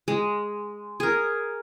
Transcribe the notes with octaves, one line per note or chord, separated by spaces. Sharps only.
G#3
G#4 A#4